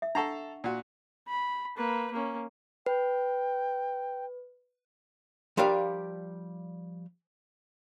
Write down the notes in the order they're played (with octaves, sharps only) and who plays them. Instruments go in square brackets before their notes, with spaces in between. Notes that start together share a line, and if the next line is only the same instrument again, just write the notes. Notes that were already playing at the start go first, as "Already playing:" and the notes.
[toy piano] E5
[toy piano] D4 F#5 C#6 [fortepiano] A4 A5 A#5
[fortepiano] A#2 F#4
[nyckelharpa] B5
A#3 B4
A#3 C#4
[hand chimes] B4 [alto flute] G5
[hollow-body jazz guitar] F3 G3 D4 A#4 D5 F5